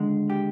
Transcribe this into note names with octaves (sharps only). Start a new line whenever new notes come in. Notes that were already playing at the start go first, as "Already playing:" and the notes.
Already playing: D#2 D3 G#3
G4